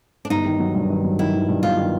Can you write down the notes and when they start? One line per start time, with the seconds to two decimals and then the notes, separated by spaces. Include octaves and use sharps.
0.25 D4
0.30 G1 D#4
0.46 D#3
0.60 F#3
0.75 G2
0.90 D#3
1.04 F#3
1.19 D#3 E4
1.34 D#3
1.49 G2
1.63 G1 F4
1.78 D#3